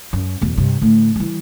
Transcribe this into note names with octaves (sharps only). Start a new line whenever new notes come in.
F#2
B1 E2
G2 C3
A2 D3
E3 G3